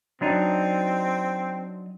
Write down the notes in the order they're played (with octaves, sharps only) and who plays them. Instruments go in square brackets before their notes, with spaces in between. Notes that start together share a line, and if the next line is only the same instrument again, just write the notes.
[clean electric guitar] F#3 D4 D#4 [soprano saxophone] C4